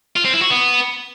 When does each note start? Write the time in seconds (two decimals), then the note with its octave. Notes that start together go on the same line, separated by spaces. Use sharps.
0.16 F4
0.25 C4
0.33 E4
0.42 F#4
0.50 B3